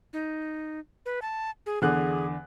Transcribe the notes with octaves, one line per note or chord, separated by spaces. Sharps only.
D#4
B4
A5
G#4
E2 D3 G#4 F#6